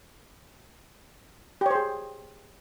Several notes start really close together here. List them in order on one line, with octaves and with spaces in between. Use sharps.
G4 C#5 C5 G#4